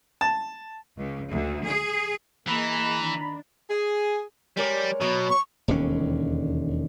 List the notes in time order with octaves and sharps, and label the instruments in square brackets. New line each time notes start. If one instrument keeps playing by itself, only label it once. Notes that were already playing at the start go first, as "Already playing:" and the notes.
[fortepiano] A5
[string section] C#2
D2
G#4
[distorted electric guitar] E3 [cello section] A#3 G#4 D#5 [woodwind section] A#5 B5
[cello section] D#3 D4
[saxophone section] G#4
[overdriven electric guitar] G3 [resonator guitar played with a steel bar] G#3 A#4 D5 [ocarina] C#5
[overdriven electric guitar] B2 [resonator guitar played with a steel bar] F#3 B3
[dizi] C#6
[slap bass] E1 D#2 D3 C#4